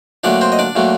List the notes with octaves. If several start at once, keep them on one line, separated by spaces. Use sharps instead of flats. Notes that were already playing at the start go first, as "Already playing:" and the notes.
A#2 F#3 A3 D4 D5
C4 C5
D#5
D4 D5
A#2 F#3 A3